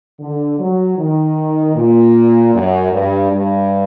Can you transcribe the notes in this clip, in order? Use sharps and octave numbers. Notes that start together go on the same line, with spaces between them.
D3
F#3
D#3
A#2
F#2
G2
G2